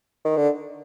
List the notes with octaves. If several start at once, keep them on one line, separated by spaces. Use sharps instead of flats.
D#3
D3